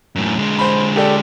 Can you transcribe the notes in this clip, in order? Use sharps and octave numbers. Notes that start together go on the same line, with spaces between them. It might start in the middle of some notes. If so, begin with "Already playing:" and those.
F#2 A2
D3 G#3
C5 B5
G4 A4 D5